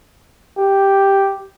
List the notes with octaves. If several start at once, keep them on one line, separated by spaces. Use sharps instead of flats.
G4